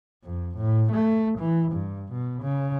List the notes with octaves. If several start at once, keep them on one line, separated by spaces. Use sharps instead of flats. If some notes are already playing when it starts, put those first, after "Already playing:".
F2
A2
A3
E3
G2
B2
C#3